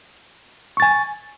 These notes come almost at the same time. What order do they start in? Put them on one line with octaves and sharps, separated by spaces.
C#6 A6 G#5